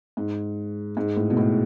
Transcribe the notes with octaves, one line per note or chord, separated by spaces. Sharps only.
G#2
G#2
A2
B2
A2